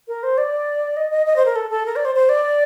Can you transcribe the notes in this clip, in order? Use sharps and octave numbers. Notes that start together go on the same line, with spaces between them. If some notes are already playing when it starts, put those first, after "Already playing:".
A#4
C5
D5
D#5
D#5
D#5
C5
A#4
A4
A4
A#4
D5
C5
C5
D5